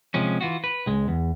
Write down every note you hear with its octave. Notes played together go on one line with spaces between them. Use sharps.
C3 F3 G#3 C#4
E3 F4 F#4
B4
C#2 G#3
E2